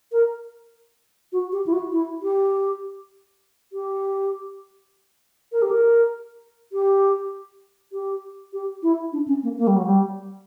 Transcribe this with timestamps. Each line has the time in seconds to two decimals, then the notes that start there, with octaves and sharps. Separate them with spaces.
0.12 A#4
1.33 F#4
1.52 G4
1.66 E4
1.73 F#4
1.92 E4
2.23 G4
3.73 G4
5.52 A#4
5.62 G4
5.71 A#4
6.73 G4
7.93 G4
8.53 G4
8.83 E4
9.13 D4
9.28 C#4
9.43 A#3
9.58 A#3
9.67 G3
9.76 F#3
9.86 G3